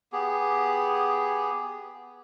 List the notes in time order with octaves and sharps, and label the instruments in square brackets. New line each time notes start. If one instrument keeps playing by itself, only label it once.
[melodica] B3 G4 G#4